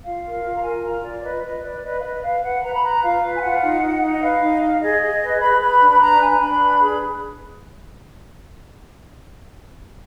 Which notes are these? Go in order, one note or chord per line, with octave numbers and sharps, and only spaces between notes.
F4 F5
A#4
F4
A#5
A#4 G#5
F4 A#5
F4 D5
B4 D#5
B4 D#5
B4 D5
B4 D#5
F5
B4 D#5
B4 F5
B4 F#5
B4 A#5
B5
B4 A#5
F4 F5
B4
G#5
F4 F#5
D#4
D#4
D#4
D#5
B4 F5
D#4
D#4
G#4 D#5
G#4
B4
B4 B5
B4
B5
D4
B5
B4 A#5
D4 G#5
D4 B5
B4
G#4